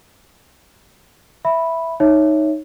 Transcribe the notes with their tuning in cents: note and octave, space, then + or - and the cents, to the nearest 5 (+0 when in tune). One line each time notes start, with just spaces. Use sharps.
E5 +0 B5 -5
D#4 +0 C#5 +0 E5 +0